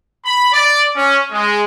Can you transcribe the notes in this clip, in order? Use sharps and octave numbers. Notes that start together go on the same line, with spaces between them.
B5
D5
C#4
G#3